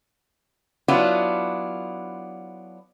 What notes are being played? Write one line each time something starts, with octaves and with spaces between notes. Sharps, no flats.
F#3 B3 D4 E4 F4